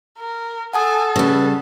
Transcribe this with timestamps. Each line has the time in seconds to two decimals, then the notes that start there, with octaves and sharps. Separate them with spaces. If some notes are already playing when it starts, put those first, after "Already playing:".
0.19 A#4
0.73 A4 F#5 G#5 A5 D#6
1.16 C#3 G3 B4